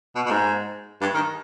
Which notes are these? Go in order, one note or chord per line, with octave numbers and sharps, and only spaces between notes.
B2
B2
G#2
G2
D#3